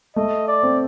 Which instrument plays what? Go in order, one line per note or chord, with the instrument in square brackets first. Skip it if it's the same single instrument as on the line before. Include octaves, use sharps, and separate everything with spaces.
[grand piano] A3 [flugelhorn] D#5
[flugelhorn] D5
[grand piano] C4